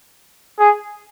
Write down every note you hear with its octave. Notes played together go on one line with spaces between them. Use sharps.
G#4